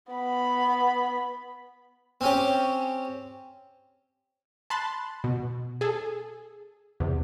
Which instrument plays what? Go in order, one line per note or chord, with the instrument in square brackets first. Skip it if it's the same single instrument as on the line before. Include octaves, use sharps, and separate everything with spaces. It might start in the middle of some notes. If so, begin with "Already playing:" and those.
[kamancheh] B3 B5
[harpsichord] C4 C#4 G4
[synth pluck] A5 B5 C6 F#6 A6
B2
G#4 A4
E2 C3